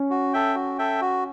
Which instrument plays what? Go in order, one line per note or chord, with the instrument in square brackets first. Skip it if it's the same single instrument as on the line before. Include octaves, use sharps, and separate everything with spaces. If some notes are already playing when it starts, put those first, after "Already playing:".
Already playing: [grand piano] C#4
[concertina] F#4
A4 E5 G5
F#4
A4 E5 G5
F#4